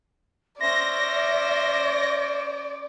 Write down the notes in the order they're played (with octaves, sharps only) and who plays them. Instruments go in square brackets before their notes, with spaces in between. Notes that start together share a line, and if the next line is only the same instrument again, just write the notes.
[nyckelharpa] C#4 C5 [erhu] D5 [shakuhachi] E5 [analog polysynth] A#6